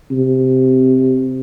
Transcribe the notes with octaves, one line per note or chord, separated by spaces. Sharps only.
C3